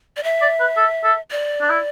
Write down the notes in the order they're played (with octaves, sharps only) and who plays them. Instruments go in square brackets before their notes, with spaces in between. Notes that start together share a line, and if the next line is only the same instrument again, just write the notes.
[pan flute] D5
E5
[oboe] D5
B4
A4
A4
[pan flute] D5
[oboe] D4
E4